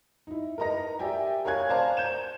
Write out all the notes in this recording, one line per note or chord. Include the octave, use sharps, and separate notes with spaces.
D#4 E4
A#4 B4 D#5 A#5 A#6
G4 D5 E5 G5 G#5
A#4 C#5 F5 G#5 F#6 G#6
C5 D5 F5 A5 A#5
G6 E7